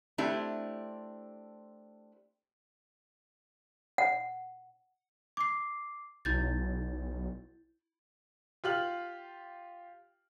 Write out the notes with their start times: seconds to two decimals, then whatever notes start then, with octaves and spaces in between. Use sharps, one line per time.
0.18 A3 C4 D4 E4 G4
3.98 F#5
5.37 D6 C7
6.25 B1 E4 G6 A6
8.64 F4 G4 F6 F#7